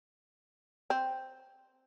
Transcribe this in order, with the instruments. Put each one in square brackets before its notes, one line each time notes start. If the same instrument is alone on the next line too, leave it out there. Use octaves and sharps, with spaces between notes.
[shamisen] C4